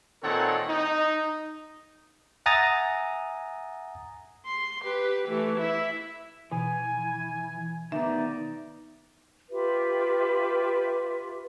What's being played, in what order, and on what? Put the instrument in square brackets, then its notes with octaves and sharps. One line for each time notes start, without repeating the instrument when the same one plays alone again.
[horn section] A#2 D#3 C4 A4 C#5 F#5
D#4
[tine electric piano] E5 F#5 G#5 A#5 D#6 A6
[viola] C6
G4 B4
E3 A3
E4 E5
[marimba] B2 [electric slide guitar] E3 [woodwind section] G#5
[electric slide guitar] D#3 B3 [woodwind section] D#4 D5 [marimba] E5
[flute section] F4 G4 B4 E5